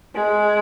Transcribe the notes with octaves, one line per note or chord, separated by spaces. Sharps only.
G#3